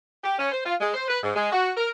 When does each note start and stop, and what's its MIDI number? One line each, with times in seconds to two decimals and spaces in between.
0.24 0.36 67
0.39 0.51 61
0.52 0.62 72
0.65 0.74 65
0.80 0.89 56
0.94 1.08 72
1.08 1.18 71
1.23 1.32 44
1.36 1.50 56
1.52 1.72 66
1.77 1.88 70